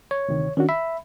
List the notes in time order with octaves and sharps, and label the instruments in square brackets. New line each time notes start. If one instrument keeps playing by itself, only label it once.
[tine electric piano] C#5
[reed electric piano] D2 C3 D#3
[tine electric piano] D#3 [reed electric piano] C#4 D4 F#4
[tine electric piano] E5 [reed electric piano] B5